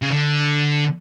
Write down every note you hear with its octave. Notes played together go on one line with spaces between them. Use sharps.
C#3
D3